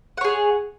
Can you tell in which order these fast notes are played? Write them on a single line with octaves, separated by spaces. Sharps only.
F#5 C#5 G#4